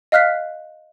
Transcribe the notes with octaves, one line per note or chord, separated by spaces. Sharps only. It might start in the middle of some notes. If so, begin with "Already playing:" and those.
D#5 F5 F6 F#6 B6 C7